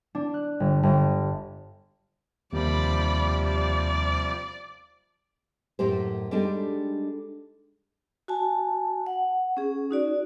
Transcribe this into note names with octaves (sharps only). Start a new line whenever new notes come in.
D4
F#6
G1
G1
D#2 C3 F3 G3 D5 B5
D5
F#2 A2 A#3 G4 C5
G3 G#3 D4 D#4 G4 A4
F#4 G#5 A5
F#5
C#4 G#4
D#4 F#4 D5